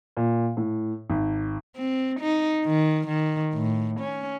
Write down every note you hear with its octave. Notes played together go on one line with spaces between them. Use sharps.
A#2
A2
G#1
C4
D#4
D#3
D#3
A2
C#4